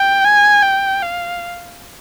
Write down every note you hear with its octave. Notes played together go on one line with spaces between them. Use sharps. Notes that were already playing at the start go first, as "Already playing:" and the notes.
Already playing: G5
G#5
G5
F5